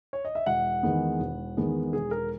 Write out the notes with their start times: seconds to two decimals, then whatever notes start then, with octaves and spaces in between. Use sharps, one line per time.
0.13 C#5
0.25 D#5
0.35 E5
0.46 E1 F#5
0.83 E2 D#3 G#3 B3
1.20 E1
1.57 E2 D#3 G#3 B3
1.93 E1 G#4
2.11 A#4